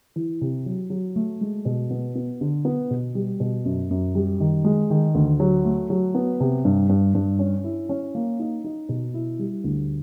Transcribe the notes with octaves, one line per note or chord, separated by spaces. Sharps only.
E3
C3
F#3
F#3
A3
G#3
B2
B3
B3
D3
B3
B2
G3
B2
F#2
F#2
G3
D#3
G#3
D#3
D2
F#3
A3
F#3
B3
C3
G2
G2
G2
C#4
E4
C#4
A#3
D#4
D#4
B2
E4
G3
D2